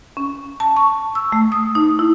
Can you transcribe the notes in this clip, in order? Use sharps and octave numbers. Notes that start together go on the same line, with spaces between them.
C#4
A5
C#6
E6
A3
D#6
D#4
E4